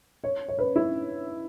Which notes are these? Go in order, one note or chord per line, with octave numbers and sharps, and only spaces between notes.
C#5
C#5
B4
E4